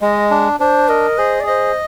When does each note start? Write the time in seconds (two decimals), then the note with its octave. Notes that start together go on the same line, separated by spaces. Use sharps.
0.01 G#3 D#5
0.31 D4
0.60 D4 C5
0.89 A#4 D#5
1.18 G#4 C5
1.40 D5
1.47 C5 D#5